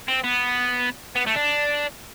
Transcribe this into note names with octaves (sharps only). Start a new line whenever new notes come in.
C4
B3
B3
A3
D4